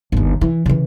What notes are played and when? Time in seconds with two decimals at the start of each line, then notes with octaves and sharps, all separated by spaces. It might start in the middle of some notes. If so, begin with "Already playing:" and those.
0.12 G1 D#2
0.41 E3
0.66 C#3 E3